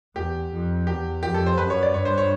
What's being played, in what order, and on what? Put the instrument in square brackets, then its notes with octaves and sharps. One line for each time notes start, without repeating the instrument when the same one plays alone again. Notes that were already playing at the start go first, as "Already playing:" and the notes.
[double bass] E2 [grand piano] G4
[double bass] F2
[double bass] E2 [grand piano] G4
[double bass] F2 [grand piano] G4
[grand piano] A4
C5
[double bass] F#2 [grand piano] B4
[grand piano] C#5
D5
[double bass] G2 [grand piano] C#5
[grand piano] C5
C#5